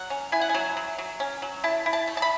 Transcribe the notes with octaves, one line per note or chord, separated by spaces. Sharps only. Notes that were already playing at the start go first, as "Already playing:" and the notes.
Already playing: F#3 F#5
C#4
E4 G#5
F#5
F#3 G#5
F#3
F#3
C#4
F#3
E4 A5
E4
A5
A3
A5
B5